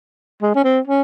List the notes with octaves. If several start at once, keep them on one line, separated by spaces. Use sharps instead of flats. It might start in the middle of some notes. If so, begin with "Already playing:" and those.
G#3
C#4
C4
C#4